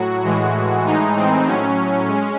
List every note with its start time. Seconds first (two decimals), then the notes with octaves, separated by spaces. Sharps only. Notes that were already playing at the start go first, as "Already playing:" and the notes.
Already playing: A2 F#3 F#4
0.23 A2 E3 G#3
0.85 A2 E3 G#3 D#4
1.15 C4
1.46 A2 F#3 C#4
2.08 G#3